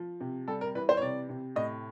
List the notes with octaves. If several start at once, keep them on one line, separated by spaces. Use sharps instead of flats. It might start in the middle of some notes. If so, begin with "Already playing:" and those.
Already playing: F3
C3
G3 A4
A#4
E3 B4
C5
C#5
C3 D5
C3
A2 D#5